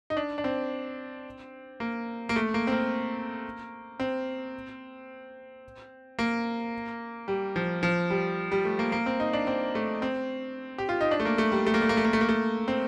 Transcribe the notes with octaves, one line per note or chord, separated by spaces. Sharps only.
D#4
D4
D4
C4
A#3
A#3
A3
A#3
C4
A#3
C4
A#3
G3
F3
F3
G3
G3
A3
A#3
A#3
C4
D#4
D4
C4
A3
C4
G4
F4
D#4
D4
A3
A#3
A3
G3
A3
A#3
A3
A#3
A3
A#3
A3
A#3
A3
C4